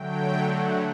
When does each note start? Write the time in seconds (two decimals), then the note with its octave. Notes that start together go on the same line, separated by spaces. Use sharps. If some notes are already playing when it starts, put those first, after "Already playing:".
Already playing: D3 F#3 A3 G5
0.46 F#5